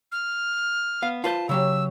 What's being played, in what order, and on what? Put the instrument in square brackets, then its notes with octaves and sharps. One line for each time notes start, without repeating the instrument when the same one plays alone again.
[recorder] F6
[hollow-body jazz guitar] B3 F5
[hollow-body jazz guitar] F4 B4 C5 [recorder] A5
[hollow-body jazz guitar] C#3 F#3 G4 [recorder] E6